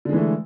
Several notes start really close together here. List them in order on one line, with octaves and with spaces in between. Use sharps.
D3 G#3 E3 A3